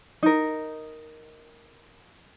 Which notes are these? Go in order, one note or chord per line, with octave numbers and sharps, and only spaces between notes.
D#4 A#4